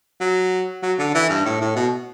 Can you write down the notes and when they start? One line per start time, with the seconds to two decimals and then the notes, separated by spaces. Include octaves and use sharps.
0.20 F#3
0.82 F#3
0.99 D3
1.14 E3
1.29 G2
1.45 A2
1.61 A2
1.76 B2